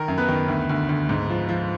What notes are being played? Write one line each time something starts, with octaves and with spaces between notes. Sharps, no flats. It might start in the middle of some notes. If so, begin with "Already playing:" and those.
Already playing: D#3 A#4
F#2
B3 B4
D#3
D2
D2
D2
G#2
F3
F3